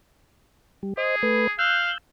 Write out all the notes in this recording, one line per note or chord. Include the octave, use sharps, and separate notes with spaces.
G3
G#4 C5 D#5
A3 B4
F5 E6 F#6 G6